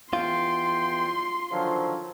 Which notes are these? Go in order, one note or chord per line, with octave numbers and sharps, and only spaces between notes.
E2 F4 G5 C6
D3 D#3 F3 F#3